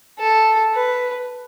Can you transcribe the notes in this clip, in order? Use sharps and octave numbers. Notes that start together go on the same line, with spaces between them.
A4
B4